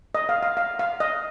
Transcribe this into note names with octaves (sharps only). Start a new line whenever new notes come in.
D#5
F5
F5
F5
F5
D#5